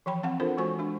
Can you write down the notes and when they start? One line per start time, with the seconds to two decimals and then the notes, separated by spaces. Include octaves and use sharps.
0.06 E3 F3 G5 B5
0.23 C4 F5 F#5
0.40 D4 F4 A4 A#4 C5
0.58 E3 G#3 F#4 C5 G#5 C#6
0.79 G#3 D4